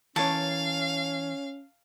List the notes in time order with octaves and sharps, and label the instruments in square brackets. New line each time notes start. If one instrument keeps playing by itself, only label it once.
[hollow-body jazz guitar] E3 A#4 C#5 [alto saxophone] C#4 [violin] F5 [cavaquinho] A5